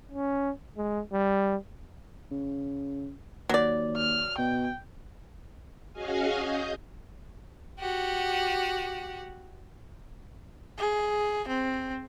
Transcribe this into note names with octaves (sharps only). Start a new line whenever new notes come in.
C#4
G#3
G3
C#3
D#2 F#3 D5
F6
B2 G5
C#4 F#4 G#4 D#5 F5 G#5
D#5 G6
F#4 G4 F#5
G#4
C4